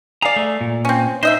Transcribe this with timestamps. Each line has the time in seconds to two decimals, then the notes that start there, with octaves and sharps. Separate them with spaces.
0.22 G#4 D5 F5 A#5
0.36 A3
0.61 A#2
0.85 C4 C#4
1.23 D#4 C5 D#5 E5